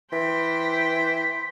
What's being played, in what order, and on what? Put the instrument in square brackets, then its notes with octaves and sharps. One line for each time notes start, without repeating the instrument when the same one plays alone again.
[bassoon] E3 [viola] C5 G5 [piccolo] B6